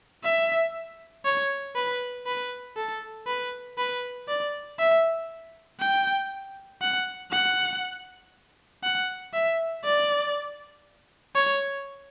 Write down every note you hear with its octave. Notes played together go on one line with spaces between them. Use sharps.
E5
C#5
B4
B4
A4
B4
B4
D5
E5
G5
F#5
F#5
F#5
E5
D5
C#5